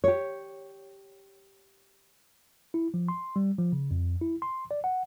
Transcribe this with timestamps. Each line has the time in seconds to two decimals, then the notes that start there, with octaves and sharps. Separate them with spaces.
0.04 G4 C#5
2.74 E4
2.94 F3
3.08 C6
3.36 G3
3.58 F3
3.73 C#3
3.91 F2
4.22 E4
4.42 C6
4.71 D5
4.84 F#5